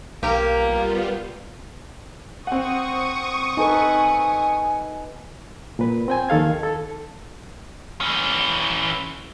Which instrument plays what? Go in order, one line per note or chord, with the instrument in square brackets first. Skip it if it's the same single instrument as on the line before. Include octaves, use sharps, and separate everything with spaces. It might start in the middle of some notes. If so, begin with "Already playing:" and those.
[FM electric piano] B1 [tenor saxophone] A#3 [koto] G4 A#4
[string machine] G3 B3 F4
[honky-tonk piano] C4 F#5 [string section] C#6 D#6
[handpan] D#4 A4 B4 [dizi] G#5
[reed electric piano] A#2 B4
C4 G5 G#5
D#2 D#3 A4 F5 G#6
A4
[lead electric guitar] E3 C#4